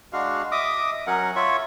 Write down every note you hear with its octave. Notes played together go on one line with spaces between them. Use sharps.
G#3 D4 F#4 F5
D#5 E5 D6 D#6
F#3 C#4 A#4 F#5
F4 C#5 E5 C#6